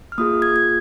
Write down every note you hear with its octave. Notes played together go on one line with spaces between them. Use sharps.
F6
A#3 F4 G#4 D#6
G#6
G#6